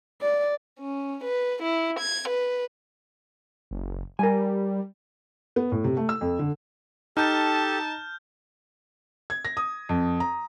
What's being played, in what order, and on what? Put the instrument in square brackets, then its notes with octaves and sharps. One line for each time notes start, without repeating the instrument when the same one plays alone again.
[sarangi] D5
[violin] C#4
B4
E4
G#6
B4
[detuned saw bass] F#1
[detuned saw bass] G3 [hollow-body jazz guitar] A#4 G#5
[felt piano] B3
A2
C3
A3
E6
F2
D3
[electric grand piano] D#4 [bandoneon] G4 A4 [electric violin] A5 [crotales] F6 G6
[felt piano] G#6
A#6
D#6
F2
A#5